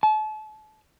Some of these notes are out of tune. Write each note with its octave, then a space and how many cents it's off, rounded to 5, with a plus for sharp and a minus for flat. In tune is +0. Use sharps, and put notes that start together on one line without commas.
A5 -35